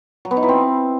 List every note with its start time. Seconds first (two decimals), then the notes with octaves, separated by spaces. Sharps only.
0.25 F#3
0.31 B3
0.37 D#4
0.43 E4
0.49 C4